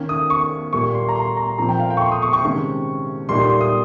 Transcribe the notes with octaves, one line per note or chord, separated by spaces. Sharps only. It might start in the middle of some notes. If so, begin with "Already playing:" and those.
Already playing: D#3 A#3 C#4
D#6
C#6
A#2 G3 A#3 C#6
C6
A#5
C6
A#5
A#2 F3 C4 A#5
G5
F5
G5
C#6
C6
D#6
C#6
C#6
C3 D#3 G#3 C#4
A#2 G3 A#3 D#4 C6
C6
C6
D#6